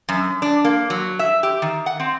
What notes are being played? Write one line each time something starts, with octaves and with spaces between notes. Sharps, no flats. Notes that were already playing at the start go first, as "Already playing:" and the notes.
F#2
D4
A#3
F#3
E5
G4
D#3
F#5
C4